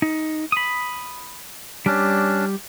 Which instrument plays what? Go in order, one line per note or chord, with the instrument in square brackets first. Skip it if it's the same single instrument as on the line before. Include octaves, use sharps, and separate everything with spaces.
[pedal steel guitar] D#4
B5 D#6
[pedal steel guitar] G3 G4 [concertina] C#4 D4